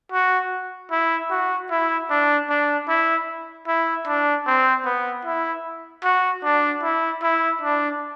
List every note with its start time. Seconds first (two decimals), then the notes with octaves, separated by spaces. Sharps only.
0.12 F#4
0.91 E4
1.30 F#4
1.70 E4
2.10 D4
2.50 D4
2.88 E4
3.67 E4
4.07 D4
4.47 C4
4.85 B3
5.25 E4
6.04 F#4
6.44 D4
6.83 E4
7.23 E4
7.62 D4